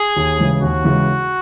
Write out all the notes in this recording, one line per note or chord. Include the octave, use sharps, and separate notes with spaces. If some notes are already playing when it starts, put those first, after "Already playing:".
Already playing: G#4
D#2
C#3 E3 G#3
D#2 F#4
C#3 E3 G#3